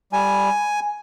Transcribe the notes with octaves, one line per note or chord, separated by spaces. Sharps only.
G3 G#5